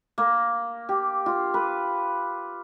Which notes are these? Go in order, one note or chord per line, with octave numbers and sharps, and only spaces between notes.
A#3
G4
F4
B4